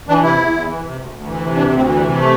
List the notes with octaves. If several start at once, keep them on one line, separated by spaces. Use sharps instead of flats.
E3 D4
C3 E4
E2
E2
E3
C3
D2
D2
E3
C3
D2 D4
D2
C4
E3
G3
C3
A3